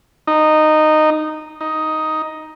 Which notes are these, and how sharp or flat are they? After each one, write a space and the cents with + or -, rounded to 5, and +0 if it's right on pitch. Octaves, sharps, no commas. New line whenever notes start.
D#4 -10
D#4 +10